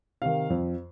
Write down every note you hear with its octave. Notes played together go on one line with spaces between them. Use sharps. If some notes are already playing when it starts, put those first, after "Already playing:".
C3 D#3 F5
F2